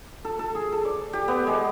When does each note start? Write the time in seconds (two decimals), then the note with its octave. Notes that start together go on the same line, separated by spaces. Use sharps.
0.25 A4
0.39 A4
0.55 G#4
0.72 A4
0.85 D5
1.13 G4
1.28 B3
1.47 G#3